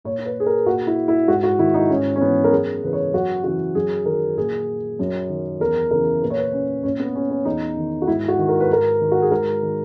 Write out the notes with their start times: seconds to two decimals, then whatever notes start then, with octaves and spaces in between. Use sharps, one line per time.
0.04 A#2 C#5
0.25 B4
0.40 G#4
0.46 A#4
0.66 A#2 F#4
0.87 E4
1.08 E4
1.28 G#2 F#4
1.43 F#4
1.59 D#3 E4
1.74 D#4
1.90 G#2 C#4
2.16 C#4
2.21 E3 B3
2.44 A#4
2.51 F#2 G#4
2.83 C#3 E3 B4
2.93 C#5
3.13 F#2 F#4
3.44 C#3 E3 F#4
3.75 F#2 G#4
4.06 D#3 A#4
4.37 A#2 G#4
4.99 F#2
5.29 D#3
5.60 E2 A#4
5.91 C#3 E3 A#4
6.22 A#2 B4
6.30 C#5
6.37 B4
6.53 C#4
6.83 A#2 C#4
7.00 B3
7.15 C#4
7.30 C#4
7.45 E2 D#4
7.77 D#3
8.02 F#4
8.07 G#2 E4
8.28 F#4
8.38 D#3
8.49 A#4
8.60 B4
8.69 G#2 A#4
9.01 D#3
9.12 F#4
9.22 G#4
9.31 G#2 A#4
9.62 D#3